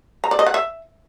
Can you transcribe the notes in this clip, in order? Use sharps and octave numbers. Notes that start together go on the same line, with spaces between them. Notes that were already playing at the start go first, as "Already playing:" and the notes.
A#5
D5
D#5
F#5
E5